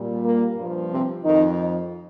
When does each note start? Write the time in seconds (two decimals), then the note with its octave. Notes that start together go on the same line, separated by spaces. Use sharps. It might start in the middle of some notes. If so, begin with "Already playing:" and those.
Already playing: A#2 G3
0.24 A#3
0.57 G2 F3
0.91 C3 C4
1.23 F2 D#3 F3 D#4